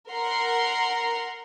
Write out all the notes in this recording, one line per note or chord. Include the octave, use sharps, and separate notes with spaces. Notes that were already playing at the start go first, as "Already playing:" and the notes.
A#4 F#5 A#5 C6